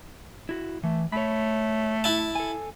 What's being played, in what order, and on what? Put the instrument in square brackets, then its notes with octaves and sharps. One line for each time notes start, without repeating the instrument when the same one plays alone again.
[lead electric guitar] E4 F#4
[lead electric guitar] E3 [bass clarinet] A3
[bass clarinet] A3 [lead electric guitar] C#5 B5
[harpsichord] E4 A5
[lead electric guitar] A4 G#5